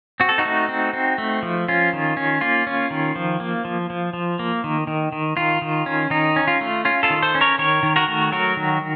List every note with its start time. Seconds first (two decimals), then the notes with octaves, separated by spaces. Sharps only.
0.20 C4 F#4
0.29 A4
0.38 D#4 F#4
0.45 A3
0.69 C4
0.93 C4
1.18 A3
1.43 F3
1.68 C#4 F4
1.93 D#3
2.17 C#4
2.41 A#3 F4
2.67 C#4
2.90 D#3
3.16 F3
3.40 A#3
3.65 F3
3.90 F3
4.13 F3
4.39 A#3
4.64 D#3
4.87 D#3
5.12 D#3
5.37 D#3 F4
5.62 D#3
5.86 C#4
6.10 D#3 D#4
6.36 C#4
6.48 F4
6.61 A3
6.85 C#4 F4
7.03 F4 A4
7.10 D#3
7.22 A4 C5
7.35 C#4
7.41 A#4 C#5
7.58 D#3 A#4 C#5
7.83 D#3
7.96 F#4 A#4
8.08 A3
8.32 F#3 F#4 A#4
8.57 D#3